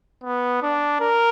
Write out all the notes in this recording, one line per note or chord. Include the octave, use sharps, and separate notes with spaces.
B3
D4
A#4